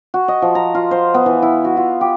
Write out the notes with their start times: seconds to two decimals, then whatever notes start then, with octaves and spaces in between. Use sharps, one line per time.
0.14 F#4
0.28 D#5
0.42 F3
0.55 A#5
0.75 F4
0.91 C5
1.14 B3
1.26 E3
1.42 E4
1.64 F#4
1.77 F4
2.01 G4